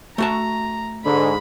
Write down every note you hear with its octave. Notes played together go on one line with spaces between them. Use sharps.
A3 F#4 A5 A#5
G#2 D3 B5